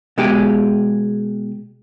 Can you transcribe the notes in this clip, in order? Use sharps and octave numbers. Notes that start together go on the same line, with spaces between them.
B2 G#3 G4 G#4